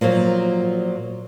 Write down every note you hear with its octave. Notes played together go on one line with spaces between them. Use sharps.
A#2 F3 F#3 A#3